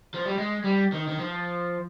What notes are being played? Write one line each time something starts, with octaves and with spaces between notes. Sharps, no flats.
F3
G3
G#3
G3
D#3
D#3
F3